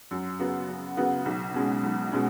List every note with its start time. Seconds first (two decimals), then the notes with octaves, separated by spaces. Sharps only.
0.11 F#2
0.39 C#3 B3 F#4
0.68 F#2
0.97 C#3 B3 F#4
1.26 B1
1.54 B2 G#3 C#4
1.83 B1
2.12 B2 G#3 C#4